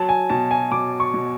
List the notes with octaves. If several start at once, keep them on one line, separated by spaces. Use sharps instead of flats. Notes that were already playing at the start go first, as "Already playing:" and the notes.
Already playing: F#3 A5
G#5
B2 A5
G#5
B2 D6
C#6
B2